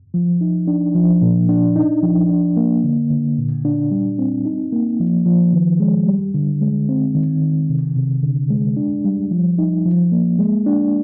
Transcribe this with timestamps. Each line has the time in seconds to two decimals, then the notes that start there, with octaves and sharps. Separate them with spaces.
0.14 F3
0.41 D#4
0.68 D4
0.95 F3
1.22 A#2
1.49 D4
1.76 D#4
2.03 F3
2.29 D4
2.57 A#3
2.84 D3
3.10 D3
3.38 A#2
3.65 D4
3.91 G3
4.19 C4
4.45 D#4
4.72 A#3
5.00 F3
5.26 F3
5.53 D#3
5.80 G#3
6.07 G3
6.34 D3
6.61 G#3
6.89 C4
7.15 D#3
7.42 D#3
7.69 C3
7.96 C3
8.23 D3
8.50 G#3
8.77 D4
9.04 G3
9.31 F3
9.59 D#4
9.85 F3
10.12 A#3
10.39 G#3
10.66 D4